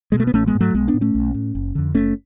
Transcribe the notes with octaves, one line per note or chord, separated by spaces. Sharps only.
B2 G#3
A3
B3
A1 A3 C#4
G#3 B3
G#2
F#3 A3
B1 G#3 B3
B3 D4
A2
A3 C#4
B1
A2
F#1
F2 D3
F#1 A3 C#4